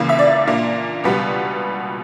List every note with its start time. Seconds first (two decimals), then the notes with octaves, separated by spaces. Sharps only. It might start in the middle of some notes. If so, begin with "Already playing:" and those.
Already playing: C#2 C#3 E3 A#3
0.09 E5
0.19 D5
0.47 A#2 A#3 D4
1.04 C#2 B2 G3 B3